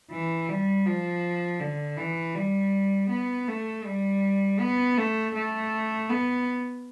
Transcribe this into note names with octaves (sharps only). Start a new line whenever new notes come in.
E3
G3
F3
D3
E3
G3
B3
A3
G3
B3
A3
A3
B3